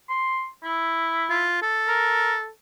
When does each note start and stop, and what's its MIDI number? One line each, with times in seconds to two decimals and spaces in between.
0.09 0.47 84
0.64 1.45 64
1.29 1.60 65
1.62 2.49 69
1.88 2.34 70